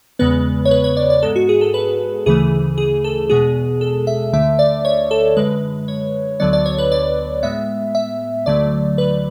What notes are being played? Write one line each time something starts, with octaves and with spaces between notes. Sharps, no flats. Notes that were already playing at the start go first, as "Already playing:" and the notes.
E2 C#3 G#3 B3 B4
C#5
B4
C#5
D5
D5
G#2 G#3 B3 A4
F#4
G#4
A4
B4
D2 C#3 E3 A3 G#4
G#4
A4
E2 B2 G#3 B3 G#4
A4
E5
D2 D3 A3 E5
D5
C#5
A4
F#2 D3 G#3 B4
C#5
D2 D3 F#3 B3 D5
D5
C#5
B4
D5
A2 G#3 B3 E5
E5
D2 D3 F#3 A3 D5
B4